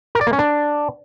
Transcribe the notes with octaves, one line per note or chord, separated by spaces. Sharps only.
A#4
D5
A#3
C#4
D4